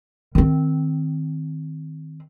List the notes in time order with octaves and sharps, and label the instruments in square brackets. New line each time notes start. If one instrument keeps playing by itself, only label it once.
[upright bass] D#3 C4